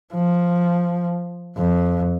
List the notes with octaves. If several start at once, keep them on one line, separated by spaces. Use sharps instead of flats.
F3
F2